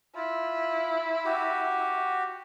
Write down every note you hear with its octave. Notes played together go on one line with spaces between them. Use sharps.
E4 F4
F#4 G4